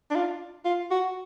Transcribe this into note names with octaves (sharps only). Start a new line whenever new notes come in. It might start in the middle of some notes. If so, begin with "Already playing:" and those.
D4
F4
F4
F#4